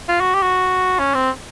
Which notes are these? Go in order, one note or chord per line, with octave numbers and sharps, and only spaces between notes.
F4
F#4
G4
F#4
C#4
C4